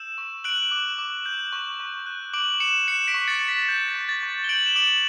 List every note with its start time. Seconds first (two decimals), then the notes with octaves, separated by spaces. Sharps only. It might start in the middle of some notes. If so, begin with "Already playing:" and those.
Already playing: E6 G6 E7
0.18 C#6
0.44 F#6 D7 F#7
0.71 D6
0.99 D6
1.26 G6
1.53 C#6
1.80 C#6
2.06 F#6
2.33 D6 D7 F#7
2.60 D6 C#7 E7
2.87 F#6 C#7 E7
3.07 B6 D7
3.14 C#6
3.28 A6 C#7
3.41 C#6
3.48 B6
3.68 G6
3.88 A6
3.95 C#6
4.09 A6
4.23 C#6
4.44 G7
4.49 G6 D7 F#7
4.66 E7
4.76 D6 D7 F#7